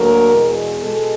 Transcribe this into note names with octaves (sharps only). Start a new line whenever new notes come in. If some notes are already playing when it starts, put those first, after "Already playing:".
Already playing: D2 D3 F#3 A#3 A#4
E2 B2 G#3
B2 G#3 A4